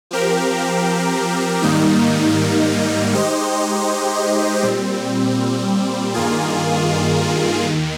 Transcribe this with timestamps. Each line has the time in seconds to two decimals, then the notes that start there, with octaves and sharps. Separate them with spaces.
0.11 F3 C4 G4 A#4
1.62 G#2 D#3 G3 A#3 D#4
3.13 G#3 D#4 G4 C5 D#5
4.63 A#2 G3 C4
6.14 G2 D#3 A#3 F4 G#4
7.64 D#2 D#3